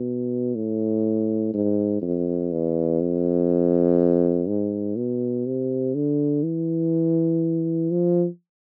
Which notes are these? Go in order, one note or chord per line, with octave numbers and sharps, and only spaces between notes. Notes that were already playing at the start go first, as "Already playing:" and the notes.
Already playing: B2
A2
G#2
F2
E2
F2
G#2
B2
C3
D3
E3
F3